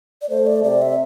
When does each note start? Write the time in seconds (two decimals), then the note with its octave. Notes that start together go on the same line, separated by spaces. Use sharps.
0.22 D5
0.30 A3 C5
0.47 D5
0.64 C3 D5
0.82 E5